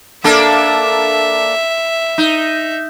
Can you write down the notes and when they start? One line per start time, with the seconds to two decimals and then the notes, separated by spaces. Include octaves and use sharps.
0.24 A#3 D4 A4 E5
2.18 D#4